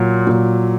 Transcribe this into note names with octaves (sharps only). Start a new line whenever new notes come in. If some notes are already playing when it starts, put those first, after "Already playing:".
Already playing: A#2 F#3
A#2 F#3